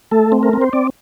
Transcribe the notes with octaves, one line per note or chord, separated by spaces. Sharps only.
A3 A4
C4
A#4
C4
C5
C4 D5